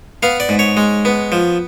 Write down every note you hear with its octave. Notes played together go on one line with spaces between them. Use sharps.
B3 F5
D5
G#2
C#5
G#3
B3
F3